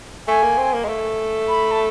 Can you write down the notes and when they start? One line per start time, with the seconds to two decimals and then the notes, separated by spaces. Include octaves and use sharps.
0.28 A3 G#5
0.43 A#3
0.58 C4
0.74 A#3
0.84 G#3
0.88 A3
1.48 B5
1.72 A5